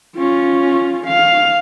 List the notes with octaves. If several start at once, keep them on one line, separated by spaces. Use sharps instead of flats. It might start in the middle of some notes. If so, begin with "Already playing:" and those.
C#4 F4
F5